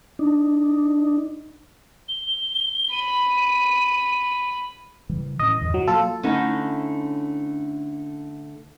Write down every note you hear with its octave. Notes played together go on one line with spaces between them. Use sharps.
D4 D#4
G7
B5 D#7
C#3 E3 G3
A2 E3 C#4 D#5
E2 G2 D3
B2 F#3
F#3 A#3 F4 A4
D3 A3 C#4 D#4 E4